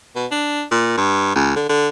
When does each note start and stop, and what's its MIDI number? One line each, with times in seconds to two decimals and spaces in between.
0.16 0.26 47
0.31 0.63 62
0.71 0.96 46
0.97 1.34 43
1.35 1.54 37
1.56 1.65 50
1.69 1.88 50